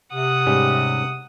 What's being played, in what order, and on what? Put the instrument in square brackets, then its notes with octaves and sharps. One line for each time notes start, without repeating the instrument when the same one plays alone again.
[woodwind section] C3 [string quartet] F#5 D#6
[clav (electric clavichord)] G#2 G3 C#4